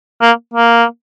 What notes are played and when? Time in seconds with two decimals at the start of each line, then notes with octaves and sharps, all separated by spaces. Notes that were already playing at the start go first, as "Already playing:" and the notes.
0.21 A#3
0.54 A#3